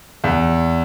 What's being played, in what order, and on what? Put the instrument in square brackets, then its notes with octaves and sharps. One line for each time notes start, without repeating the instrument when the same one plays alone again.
[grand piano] E2